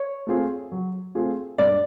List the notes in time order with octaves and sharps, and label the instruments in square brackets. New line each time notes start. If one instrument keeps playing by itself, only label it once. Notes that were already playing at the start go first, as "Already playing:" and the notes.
Already playing: [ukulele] C#5
[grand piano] A3 C4 F4 G#4
F#3
A3 C4 F4 G#4
[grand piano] G2 [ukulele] D5